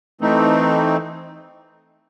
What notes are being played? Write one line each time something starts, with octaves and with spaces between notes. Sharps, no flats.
E3 A3 C4 D#4